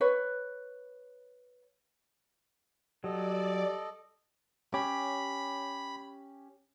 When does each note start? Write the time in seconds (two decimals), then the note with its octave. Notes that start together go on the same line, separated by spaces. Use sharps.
0.01 B4 C#5
3.04 F#3 G3 A4 D5 D#5
4.74 C#4 G4 B5